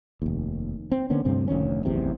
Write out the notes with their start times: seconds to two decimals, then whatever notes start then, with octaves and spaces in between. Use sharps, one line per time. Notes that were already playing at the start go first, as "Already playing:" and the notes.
0.22 F1 D#2
0.92 C4
1.10 D3 A#3 B3 C#4
1.25 D2 G2 C3 C4
1.48 F1 D2 D#3 C#4
1.85 D1 A1 E2 C3